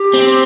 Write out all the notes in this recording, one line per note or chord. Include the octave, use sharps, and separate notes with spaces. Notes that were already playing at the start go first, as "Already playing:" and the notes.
Already playing: G4
C4